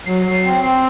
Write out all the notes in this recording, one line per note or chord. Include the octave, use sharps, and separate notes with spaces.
F#3 C7
F#3
C4
C4